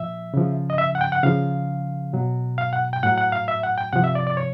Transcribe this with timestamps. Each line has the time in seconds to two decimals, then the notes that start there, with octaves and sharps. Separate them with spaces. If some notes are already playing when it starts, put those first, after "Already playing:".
Already playing: A#2 F3 E5
0.34 C#3 F3
0.70 D#5
0.78 E5
0.95 F#5
1.01 G5
1.12 F#5
1.23 C#3 F3 F5
2.13 B2 F#3
2.58 F5
2.73 F#5
2.93 G5
3.03 A2 F#3 F#5
3.18 F#5
3.32 F5
3.48 E5
3.63 F#5
3.78 G5
3.93 C3 F3 F#5
4.04 E5
4.15 D5
4.27 D5
4.37 C#5